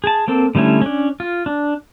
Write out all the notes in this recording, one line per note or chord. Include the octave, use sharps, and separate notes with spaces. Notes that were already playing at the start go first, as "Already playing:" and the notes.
G#4 A5
A#3 C4 A4
D3 G3 A3 C#4 E4
C#4 D4
F4
D4